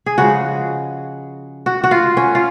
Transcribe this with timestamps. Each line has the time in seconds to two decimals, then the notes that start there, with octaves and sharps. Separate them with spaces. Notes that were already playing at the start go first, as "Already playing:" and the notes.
0.06 G#4
0.18 C#3 F3 G#3 F#4
1.66 F#4
1.84 F#4
1.91 F4
2.17 C#4
2.35 F4